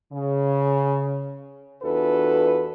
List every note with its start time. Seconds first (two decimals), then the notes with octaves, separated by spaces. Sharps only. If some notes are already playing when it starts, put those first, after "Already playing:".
0.13 C#3
1.83 E2 D4 F4 F#4 A4 B4